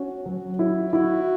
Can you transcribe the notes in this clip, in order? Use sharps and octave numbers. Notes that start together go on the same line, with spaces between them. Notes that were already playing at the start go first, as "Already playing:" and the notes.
Already playing: C#4 F#4
F#3
E4
E4 F#4